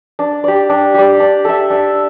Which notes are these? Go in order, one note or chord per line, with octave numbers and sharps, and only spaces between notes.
D4
G4 D5
D4
G4 D5
D4
A4 E5
D4